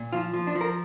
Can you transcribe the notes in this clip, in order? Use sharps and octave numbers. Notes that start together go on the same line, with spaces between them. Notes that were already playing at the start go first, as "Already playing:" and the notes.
Already playing: A#2
F3 F4
F3
D4
F3
A#4